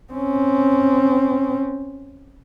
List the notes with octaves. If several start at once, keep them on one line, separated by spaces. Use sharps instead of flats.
C4 C#4